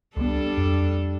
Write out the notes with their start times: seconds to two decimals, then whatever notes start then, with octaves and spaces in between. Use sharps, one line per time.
0.17 C#2 F3 G3 B3 D4 A4
0.58 F2